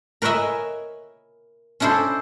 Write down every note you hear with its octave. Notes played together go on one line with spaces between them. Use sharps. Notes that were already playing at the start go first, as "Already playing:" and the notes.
A#4 B4 C#5 D#5 E5 G#5
C#4 D4 E4 A4 C5